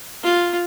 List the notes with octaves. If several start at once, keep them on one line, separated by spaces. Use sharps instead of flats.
F4